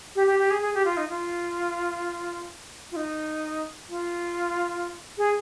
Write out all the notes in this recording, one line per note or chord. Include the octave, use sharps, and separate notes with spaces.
G4
G4
G4
G#4
G#4
G4
F4
D#4
F4
F4
D#4
F4
G#4